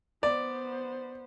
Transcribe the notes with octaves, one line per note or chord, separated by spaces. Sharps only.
B3 C5 D5